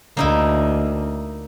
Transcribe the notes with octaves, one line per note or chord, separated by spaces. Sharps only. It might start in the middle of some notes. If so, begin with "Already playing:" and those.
D2 A#3 D#4 E4